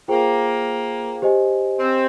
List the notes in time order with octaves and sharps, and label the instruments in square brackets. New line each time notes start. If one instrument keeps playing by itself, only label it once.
[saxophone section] A#3 [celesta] F4 G#4 C5 G5
[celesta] G4 C5 D#5 G#5
[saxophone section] C4